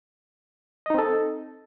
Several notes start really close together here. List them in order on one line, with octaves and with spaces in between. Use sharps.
D#5 D#4 C4 A4